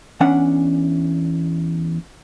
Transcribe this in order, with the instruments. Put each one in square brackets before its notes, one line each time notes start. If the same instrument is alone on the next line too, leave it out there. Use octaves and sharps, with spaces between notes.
[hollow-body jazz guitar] E2 C#4 D4 F#5